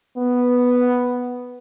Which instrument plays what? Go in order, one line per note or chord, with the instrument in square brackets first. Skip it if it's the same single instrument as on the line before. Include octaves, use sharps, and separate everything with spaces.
[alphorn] B3